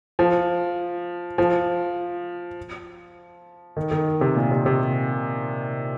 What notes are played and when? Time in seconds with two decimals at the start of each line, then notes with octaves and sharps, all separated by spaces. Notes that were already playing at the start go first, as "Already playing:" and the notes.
0.19 F3
1.38 F3
3.77 D#3
3.91 D#3
4.21 C3
4.36 A#2
4.51 C3
4.66 C3